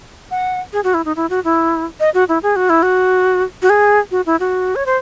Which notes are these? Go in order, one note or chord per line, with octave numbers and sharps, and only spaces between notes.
F#5
G#4
F#4
E4
D#4
E4
F#4
E4
D#5
F#4
E4
G#4
F#4
E4
F#4
F#4
G#4
F#4
E4
F#4
C#5
C5